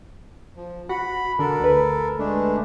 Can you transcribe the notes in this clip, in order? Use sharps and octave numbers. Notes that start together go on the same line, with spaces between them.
F3
F#4 B5
D3 A4 A#4
D2 B4
G#3 A3 D4